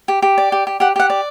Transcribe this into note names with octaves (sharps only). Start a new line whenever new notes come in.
G4
G4
D5
G4
G4
G4 F#5
G4 F#5
D5